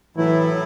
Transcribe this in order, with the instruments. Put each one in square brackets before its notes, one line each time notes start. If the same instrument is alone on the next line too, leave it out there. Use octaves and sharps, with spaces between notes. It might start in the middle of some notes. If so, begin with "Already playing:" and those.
[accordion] A2 F#3 A3 E4 [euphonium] E3